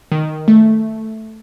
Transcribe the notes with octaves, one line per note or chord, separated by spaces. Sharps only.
D#3
A3